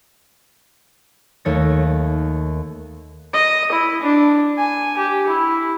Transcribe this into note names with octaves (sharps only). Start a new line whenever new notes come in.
D#2 A3 C#5 A#6
D#5
E4
D4
G#5
G4
E4